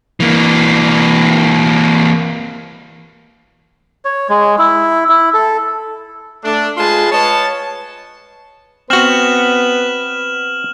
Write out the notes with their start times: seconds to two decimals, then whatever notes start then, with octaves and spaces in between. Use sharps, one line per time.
0.20 E3 A#3
4.05 C#5
4.29 G#3
4.59 E4
5.09 E4
5.34 A4
6.44 A3 D4
6.78 G#3 F4 G#4 B4 A5 C6
7.12 B4 C#5 D#5 A5
8.90 B3 C4 F#4 B4 F6 E7 F#7